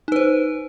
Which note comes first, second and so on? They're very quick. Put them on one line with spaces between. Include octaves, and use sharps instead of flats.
D#4 B4 C5